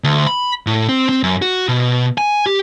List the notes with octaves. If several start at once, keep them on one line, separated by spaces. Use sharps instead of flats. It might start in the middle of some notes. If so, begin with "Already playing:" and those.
D2
B5
A2
C4
C4
F#2
F#4
B2
G#5
G4